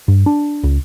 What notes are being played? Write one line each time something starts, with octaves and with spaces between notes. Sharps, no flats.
G2
D4
C#2